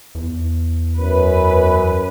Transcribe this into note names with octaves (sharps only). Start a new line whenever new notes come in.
E2
F#2 B4